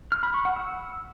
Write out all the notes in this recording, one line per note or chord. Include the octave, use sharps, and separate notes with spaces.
F6
B5
C#6
F#5
E6